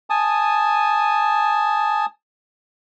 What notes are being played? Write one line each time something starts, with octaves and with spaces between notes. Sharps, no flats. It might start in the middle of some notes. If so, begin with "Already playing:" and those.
G#5 A5 D#6